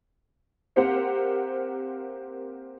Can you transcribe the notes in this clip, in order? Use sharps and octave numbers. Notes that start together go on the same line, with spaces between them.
A#3 C4 G4 A#4 C5 F#5